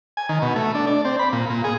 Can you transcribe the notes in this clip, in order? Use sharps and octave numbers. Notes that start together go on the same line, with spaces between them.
G#5
D#3
B2
A3
D4
D5
C4
B5
A#2
A#2
G#4